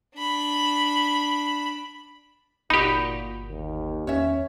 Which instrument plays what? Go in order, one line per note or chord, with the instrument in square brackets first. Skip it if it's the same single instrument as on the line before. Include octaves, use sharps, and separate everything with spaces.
[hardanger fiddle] D4 B5
[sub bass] G1 [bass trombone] A#2 [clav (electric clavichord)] D#4 G4 [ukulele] F#4 B5
[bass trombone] D#2
[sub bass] E2 [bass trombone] C#4 [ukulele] C#5 E5